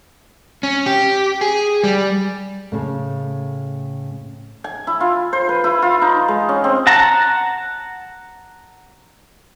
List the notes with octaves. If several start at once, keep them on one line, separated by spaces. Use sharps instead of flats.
C#4
G4
G#4
G3
A2 C#3
G#5
E4
F4
C5
B4
E4
F4
D#4
G#3
C#4
C4
F#5 A5 A#5